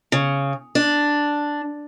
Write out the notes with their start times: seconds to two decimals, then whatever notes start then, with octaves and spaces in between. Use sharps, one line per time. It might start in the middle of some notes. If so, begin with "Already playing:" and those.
0.12 C#3
0.75 D4